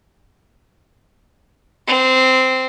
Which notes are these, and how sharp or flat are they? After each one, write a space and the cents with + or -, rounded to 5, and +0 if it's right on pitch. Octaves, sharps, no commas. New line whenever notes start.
C4 -10